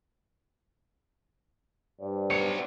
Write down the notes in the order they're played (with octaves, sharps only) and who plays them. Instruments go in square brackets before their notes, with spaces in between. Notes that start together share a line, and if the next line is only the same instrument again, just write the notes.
[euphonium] G2 [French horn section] C5 D5
[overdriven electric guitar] B3 C#5 [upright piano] C#7